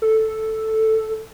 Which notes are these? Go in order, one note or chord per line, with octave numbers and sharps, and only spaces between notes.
A4